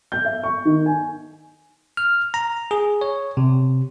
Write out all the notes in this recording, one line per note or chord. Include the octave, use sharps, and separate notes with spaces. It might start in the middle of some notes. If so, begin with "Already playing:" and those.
G6
E5
C#6
D#3
G#5
F6
A#5
G#4
C#5
C3